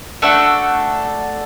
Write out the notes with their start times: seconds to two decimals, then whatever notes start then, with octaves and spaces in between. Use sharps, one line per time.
0.22 A3 D4 F#4 A4 E5 F#5